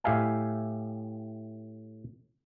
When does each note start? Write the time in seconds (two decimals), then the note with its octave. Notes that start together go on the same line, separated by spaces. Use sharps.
0.04 A2 G4 E5 F5 G#5